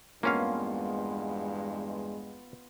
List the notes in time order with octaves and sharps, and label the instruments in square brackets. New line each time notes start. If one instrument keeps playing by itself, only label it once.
[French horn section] E2 G2 G#3 [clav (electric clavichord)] A#3 C#4 F5 [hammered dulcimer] B3 F4